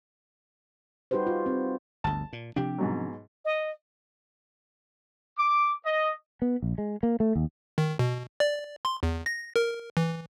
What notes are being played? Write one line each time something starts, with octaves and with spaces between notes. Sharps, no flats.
G3 D#4 F#4 G4 B4 C5
F4
C4
G1 D2 A5
A#2
C3 F3 D4 G4
G#2 B2 F#3
D#5
D6
D#5
B3
A#1
G#3
A#3
A3
D#2
D#3
B2
D5
C6
E2
A#6
A#4
E3